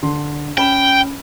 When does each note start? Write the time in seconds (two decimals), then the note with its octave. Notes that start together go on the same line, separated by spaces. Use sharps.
0.03 D3 C6
0.58 C#4 G5 B5 E7